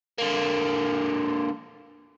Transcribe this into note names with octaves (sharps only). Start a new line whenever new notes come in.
D3 A#3